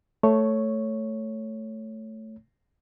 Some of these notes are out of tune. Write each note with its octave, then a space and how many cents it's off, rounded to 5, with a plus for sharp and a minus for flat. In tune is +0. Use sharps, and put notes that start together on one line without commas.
A3 +0 C#5 +0